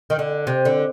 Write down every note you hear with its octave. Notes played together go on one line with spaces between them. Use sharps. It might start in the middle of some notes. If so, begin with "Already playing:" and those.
D#3
D3
C3
D3